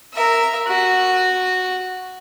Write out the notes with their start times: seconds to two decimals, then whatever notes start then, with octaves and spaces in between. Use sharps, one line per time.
0.14 A#4 E5
0.67 F#4